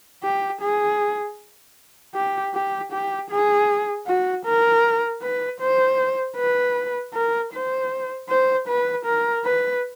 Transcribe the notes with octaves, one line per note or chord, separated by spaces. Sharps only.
G4
G#4
G4
G4
G4
G#4
F#4
A#4
B4
C5
B4
A#4
C5
C5
B4
A#4
B4